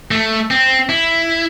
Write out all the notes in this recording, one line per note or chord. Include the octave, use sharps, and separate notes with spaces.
A3
C4
E4